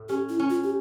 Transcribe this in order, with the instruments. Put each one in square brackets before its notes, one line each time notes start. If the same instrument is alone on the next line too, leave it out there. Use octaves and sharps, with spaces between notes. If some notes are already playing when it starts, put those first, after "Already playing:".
Already playing: [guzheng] A2
[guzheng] C#4 [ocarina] G4
[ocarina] E4
[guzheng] C#4
[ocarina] F4
G4